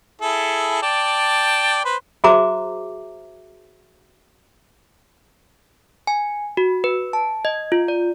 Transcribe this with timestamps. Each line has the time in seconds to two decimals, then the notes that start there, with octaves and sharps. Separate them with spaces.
0.21 E4 G#4 A4
0.82 D5 G5 A5
1.85 B4 C5
2.24 F#4 G#4 C5 E5 A#5 D6
6.07 G#5
6.57 F#4
6.84 B4
7.13 A5
7.45 D#5
7.72 F4
7.88 D5